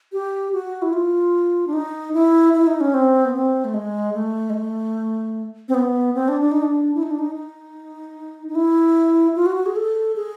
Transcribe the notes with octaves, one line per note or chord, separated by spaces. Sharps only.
G4
F#4
E4
F4
D4
D#4
E4
E4
D#4
C#4
C4
B3
C4
A3
G#3
A3
G#3
A3
C4
B3
C4
D4
D4
D#4
D4
E4
D#4
D4
D#4
D#4
D#4
E4
F4
F#4
F#4
G#4
A4
G#4